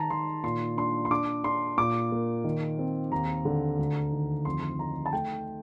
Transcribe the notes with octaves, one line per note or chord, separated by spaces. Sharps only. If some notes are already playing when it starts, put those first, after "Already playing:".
Already playing: D#3 A5 A#5
D#3 C6
A#2 C6
D4 C6
C6
D4 D6
D4 C6
A#2 D6
A#3
D#3
C4
D#2 A#5
D3
D2
D#3
F2 C6
D#4 A#5
A5
A3 G5